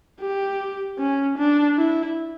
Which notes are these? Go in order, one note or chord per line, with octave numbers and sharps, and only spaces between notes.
G4
C#4
D4
E4